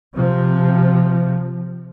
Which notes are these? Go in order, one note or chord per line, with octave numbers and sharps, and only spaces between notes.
C3 F3